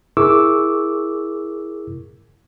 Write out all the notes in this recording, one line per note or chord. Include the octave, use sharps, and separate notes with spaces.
E4 G#4 A#4 C#6 D6 E6